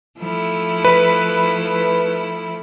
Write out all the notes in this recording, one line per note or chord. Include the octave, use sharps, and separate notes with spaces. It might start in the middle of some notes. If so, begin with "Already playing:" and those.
F3 A3 E4
B4